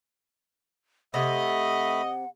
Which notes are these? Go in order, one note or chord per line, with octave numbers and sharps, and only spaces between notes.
C3 A3 D#5 F#5 B5